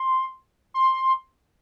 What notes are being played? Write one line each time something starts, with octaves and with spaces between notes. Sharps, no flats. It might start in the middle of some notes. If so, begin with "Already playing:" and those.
Already playing: C6
C6